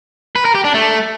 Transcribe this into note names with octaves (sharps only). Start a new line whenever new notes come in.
B4
A#4
G4
D4
A3